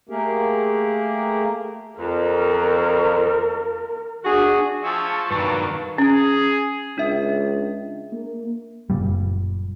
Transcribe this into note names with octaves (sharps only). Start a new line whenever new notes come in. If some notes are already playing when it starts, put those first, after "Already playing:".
A3 A#3 G4 G#4 A#4
F2 A#4
D4 F#4 G#4
F3 E5 G#5 A5 C#6
G2 D#3 F#3 A#3 D4 B4
C#4 G#4
C#2 D4 E5
A#3
F#1 B1 A#2 G3